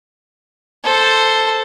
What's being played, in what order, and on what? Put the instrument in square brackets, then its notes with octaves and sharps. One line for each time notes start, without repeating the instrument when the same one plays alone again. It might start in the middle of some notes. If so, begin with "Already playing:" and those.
[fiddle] A4 C5